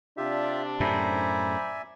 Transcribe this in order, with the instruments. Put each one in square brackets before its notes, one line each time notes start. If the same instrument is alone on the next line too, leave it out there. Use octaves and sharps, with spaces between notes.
[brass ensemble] C3 D4 [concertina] F4 G4 E5
[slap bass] F#2 A2 [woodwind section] C5 A#5 B5 [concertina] D5 E5 G#5